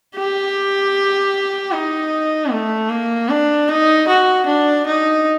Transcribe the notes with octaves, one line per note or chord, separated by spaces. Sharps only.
G4
D#4
A3
A#3
D4
D#4
F#4
D4
D#4